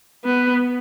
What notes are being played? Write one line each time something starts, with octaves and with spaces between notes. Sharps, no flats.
B3